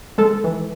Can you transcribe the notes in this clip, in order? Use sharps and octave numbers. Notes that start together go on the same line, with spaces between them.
G#3 A4
E3